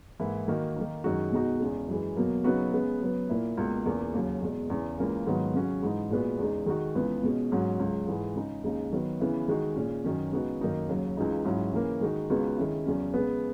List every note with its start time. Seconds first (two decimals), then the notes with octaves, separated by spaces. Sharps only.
0.20 G#2 E3 A#3 E4
0.48 D#3 A#3 D#4 F#4
0.76 D#3 A#3 D#4
1.04 F#2 D#3 G#3 D#4 F#4
1.32 B2 G#3 D#4 F#4
1.60 E2 C#3 G#3
1.88 F#2 E3 G#3
2.16 B2 F#3 A#3
2.44 C#3 F#3 B3 D#4 F#4
2.73 C#3 G#3 B3
3.01 C#3 F#3 B3
3.29 A#2 A#3 E4
3.57 C#2 B2 A#3
3.85 E2 C#3 E3 A#3
4.14 D#2 C#3 F#3 C#4
4.41 E2 B2 G#3
4.70 E2 C#3 E3
4.98 C#2 C#3 E3 A#3 C#4
5.27 G#2 D#3 F#3 B3
5.54 C#3 F#3 C#4 F#4
5.82 G#2 E3 G#3 D#4
6.11 A#2 G#3 B3 F#4
6.39 E2 C#3 G#3 D#4
6.66 D#3 G#3 D#4 F#4
6.95 C#2 C#3 E3 B3
7.23 B2 G#3 C#4
7.52 G#2 F#3 C#4 F#4
7.79 C#2 C#3 F#3
8.07 G#2 E3 G#3
8.36 C#3 G#3 D#4
8.64 D#2 C#3 G#3 D#4
8.92 D#3 F#3 B3
9.20 C#3 E3 B3 E4
9.48 D#3 G#3 D#4 F#4
9.76 A#2 G#3 C#4
10.04 F#2 D#3 F#3 C#4
10.32 C#3 G#3 B3 D#4 F#4
10.61 F#2 D#3 A#3 D#4
10.89 D#2 C#3 F#3
11.17 C#2 C#3 E3 G#3 D#4
11.45 G#2 F#3 C#4 E4
11.73 C#3 E3 A#3 C#4
12.01 D#3 G#3 D#4 F#4
12.30 C#2 C#3 G#3 B3 F#4
12.58 D#3 G#3 C#4 E4
12.86 E2 C#3 F#3 C#4
13.14 C#3 G#3 B3